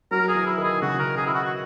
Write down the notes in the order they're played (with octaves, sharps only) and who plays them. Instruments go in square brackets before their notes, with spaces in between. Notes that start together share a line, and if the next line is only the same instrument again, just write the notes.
[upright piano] F#3 [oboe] A#4
[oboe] G#4
[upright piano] E3
[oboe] E4
[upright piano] D#3
[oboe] G#4
[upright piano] C#3 [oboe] F#4
[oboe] A#4
G#4
E4
F#4
F#4